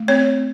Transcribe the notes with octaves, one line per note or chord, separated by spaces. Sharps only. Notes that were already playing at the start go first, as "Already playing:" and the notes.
Already playing: A3
C4 C#5